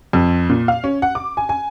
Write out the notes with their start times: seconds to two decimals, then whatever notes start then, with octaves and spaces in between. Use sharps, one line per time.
0.13 F2
0.49 A#2
0.68 F5
0.84 C#4
1.02 F#5
1.15 D6
1.37 G#5
1.49 G#5